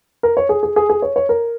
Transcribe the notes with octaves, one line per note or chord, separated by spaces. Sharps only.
A#4
C#5
G#4
G#4
G#4
G#4
C#5
C#5
A#4